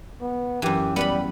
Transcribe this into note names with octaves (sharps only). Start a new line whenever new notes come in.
B3
F#2 E3 G4
G3 B3 F#5 B5